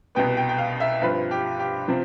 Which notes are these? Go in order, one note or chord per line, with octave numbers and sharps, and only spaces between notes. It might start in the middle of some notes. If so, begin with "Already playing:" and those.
C2 B2 B3 G5
G5
G5
F5
E5
G2 F3 C4 B4
G4
G4
C3 F3 C4